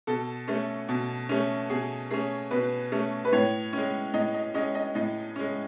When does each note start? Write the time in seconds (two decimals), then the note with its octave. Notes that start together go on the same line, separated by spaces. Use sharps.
0.07 B2 A4
0.48 A3 C#4
0.89 B2
1.29 A3 C#4
1.70 B2 G#4
2.11 A3 C#4 G#4
2.51 B2 B4
2.92 A3 C#4
3.25 B4
3.33 A2 C#5
3.73 G#3 C#4
4.14 A2 D#5
4.34 D#5
4.54 G#3 C#4 D#5
4.75 D#5
4.95 A2 D#5
5.36 G#3 C#4